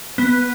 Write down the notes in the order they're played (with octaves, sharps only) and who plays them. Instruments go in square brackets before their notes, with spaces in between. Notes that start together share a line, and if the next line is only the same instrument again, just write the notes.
[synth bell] B3